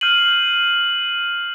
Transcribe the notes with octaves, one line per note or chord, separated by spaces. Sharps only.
F6 G6 C7 D#7 F#7